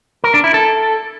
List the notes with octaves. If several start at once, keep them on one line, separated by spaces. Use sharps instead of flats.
A#4
D4
E4
A4